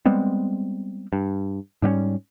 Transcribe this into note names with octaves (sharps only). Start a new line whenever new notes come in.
G3 G#3 B3 C4
G2
G#2 G3 B3 C#4